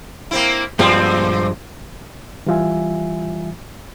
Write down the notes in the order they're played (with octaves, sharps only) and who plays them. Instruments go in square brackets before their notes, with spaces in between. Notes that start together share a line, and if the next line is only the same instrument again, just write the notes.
[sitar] A#3 C4 E4
[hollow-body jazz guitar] G2 F3 G#3 [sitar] A#2 C4
[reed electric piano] E3 G3 F4 E5 G#5